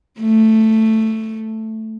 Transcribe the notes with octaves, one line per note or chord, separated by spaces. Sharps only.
A3